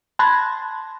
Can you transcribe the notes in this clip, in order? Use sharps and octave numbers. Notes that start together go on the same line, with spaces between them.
A5 B5 C6 F#6 G#6 A#6